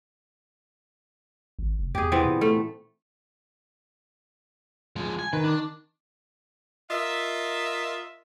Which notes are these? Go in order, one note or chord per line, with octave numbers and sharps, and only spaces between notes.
G#1
F1
E2 G4 G#4
E3 B3 C4
A#2
A3
F3 G#3
G#5
D#3 B4
D4
F4 A#4 D#5 E5